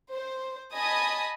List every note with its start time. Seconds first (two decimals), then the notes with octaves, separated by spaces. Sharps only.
0.13 C5
0.74 D#5 G#5 A5 B5 D#6